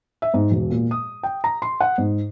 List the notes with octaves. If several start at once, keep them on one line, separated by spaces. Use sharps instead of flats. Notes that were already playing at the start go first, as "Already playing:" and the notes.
E5
G#2
E1
A#2
D#6
G5
A#5
C6
F#5
G#2